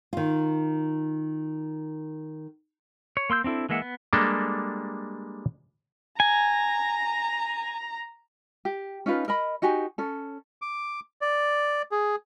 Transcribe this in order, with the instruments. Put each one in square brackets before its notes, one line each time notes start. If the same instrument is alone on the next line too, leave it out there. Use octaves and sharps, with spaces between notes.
[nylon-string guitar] D#3 F4
[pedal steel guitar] C#5
A#3 C6 E6 G6
C4 D4 E4 A4
E3 G#3 A#3 E5 F#5
B3
[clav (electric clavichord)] G3 G#3 A#3 D4 G4 A4
[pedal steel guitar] G#5 [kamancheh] A#5
[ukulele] G4
C#4 D#4 F4 B4
A#4 D#5 B5
D#4 F#4 G4 G#5
C#4 A4
[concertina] D6
D5
G#4